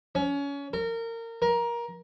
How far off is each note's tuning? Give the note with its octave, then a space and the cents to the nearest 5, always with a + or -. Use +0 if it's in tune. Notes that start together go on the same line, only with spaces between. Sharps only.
C#4 +25
A#4 -25
A#4 +20